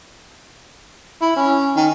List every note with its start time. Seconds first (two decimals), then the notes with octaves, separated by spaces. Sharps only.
1.21 E4
1.36 C#4
1.76 D#3